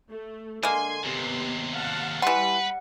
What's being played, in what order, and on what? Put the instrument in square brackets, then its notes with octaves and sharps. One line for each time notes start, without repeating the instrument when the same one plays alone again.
[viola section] A3
[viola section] D3 C6 [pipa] G#3 A#3 [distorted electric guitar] G#5
[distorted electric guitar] D#2 C3 [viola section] B3 G4 C6
[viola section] F5 F#5 A5
[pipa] E3 C6 [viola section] G3 [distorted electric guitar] B4 [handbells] F#5